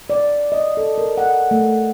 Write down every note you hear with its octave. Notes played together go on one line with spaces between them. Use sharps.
D5
D#5
A4
A#4
F#5
A3